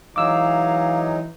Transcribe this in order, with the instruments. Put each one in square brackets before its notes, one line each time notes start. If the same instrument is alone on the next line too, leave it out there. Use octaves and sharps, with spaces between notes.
[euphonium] E3 [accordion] F#3 G#3 D#4 [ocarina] F5 [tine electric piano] D6 E6